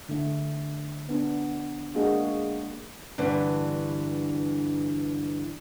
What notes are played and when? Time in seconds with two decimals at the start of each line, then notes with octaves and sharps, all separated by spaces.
0.09 D3 A3
1.09 B3 D4
1.95 G#3 A#3 D4 F#4 G#4 D#5
3.18 G2 D3 E3